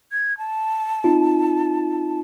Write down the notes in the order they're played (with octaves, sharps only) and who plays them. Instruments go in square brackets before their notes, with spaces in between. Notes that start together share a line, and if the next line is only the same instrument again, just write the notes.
[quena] G#6
A5
[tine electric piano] C4 D#4 F4